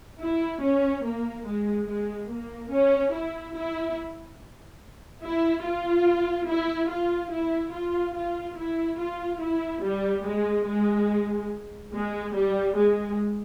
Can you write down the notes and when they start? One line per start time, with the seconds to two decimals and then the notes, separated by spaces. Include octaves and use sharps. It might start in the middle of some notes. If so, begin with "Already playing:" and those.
0.20 E4
0.61 C#4
1.04 A#3
1.45 G#3
1.87 G#3
2.29 A#3
2.71 C#4
3.12 E4
3.55 E4
5.22 E4
5.64 F4
6.47 E4
6.90 F4
7.31 E4
7.73 F4
8.15 F4
8.57 E4
8.99 F4
9.41 E4
9.83 G3
10.24 G#3
10.66 G#3
11.92 G#3
12.34 G3
12.75 G#3